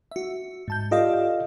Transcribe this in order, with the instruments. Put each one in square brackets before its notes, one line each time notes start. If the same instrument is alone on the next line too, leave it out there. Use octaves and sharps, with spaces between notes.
[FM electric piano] F#4 E5
G#2 A5 G6
[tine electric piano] F4 D#5 F5 [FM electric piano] G4 A4 D5